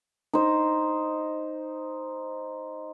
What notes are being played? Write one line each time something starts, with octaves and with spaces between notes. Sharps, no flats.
D#4 C5